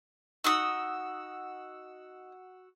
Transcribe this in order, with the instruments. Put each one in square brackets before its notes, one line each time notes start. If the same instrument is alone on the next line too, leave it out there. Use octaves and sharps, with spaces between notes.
[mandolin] D#4 D#6 [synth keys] F#4 F#5 E6